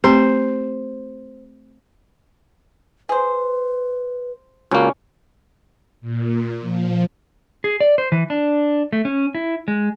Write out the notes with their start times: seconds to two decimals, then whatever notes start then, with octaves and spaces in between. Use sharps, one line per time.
0.04 A3 C4 G4 C5
3.09 G#4 B4 C5
4.71 C#2 A#3 C#4 D4 F#4
6.01 A#2
6.60 F3
7.64 G#4
7.80 D5
7.98 C5
8.12 E3
8.30 D4
8.93 A3
9.05 C#4
9.35 E4
9.68 G#3